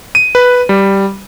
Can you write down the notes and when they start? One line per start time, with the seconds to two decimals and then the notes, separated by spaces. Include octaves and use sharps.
0.15 D#7
0.35 B4
0.69 G3